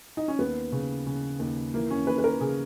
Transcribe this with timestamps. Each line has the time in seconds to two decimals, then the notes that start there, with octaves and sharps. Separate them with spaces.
0.17 D#4
0.28 C#4
0.39 D#2 B3
0.72 C#3
1.06 C#3
1.39 D#2
1.74 E3 A#3
1.90 C#4
2.07 D#2 B4
2.18 B4
2.24 A#4
2.41 C#3 G#4